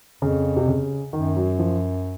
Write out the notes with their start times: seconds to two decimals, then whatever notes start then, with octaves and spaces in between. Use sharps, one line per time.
0.22 F2 C#3
0.57 C3
0.67 C#3
1.13 F#2 D#3
1.36 F#3
1.59 F3